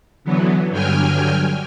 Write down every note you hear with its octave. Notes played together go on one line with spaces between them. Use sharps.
D3 E3 F#3 B3
G2 D3 F#3 G5 G#5 F6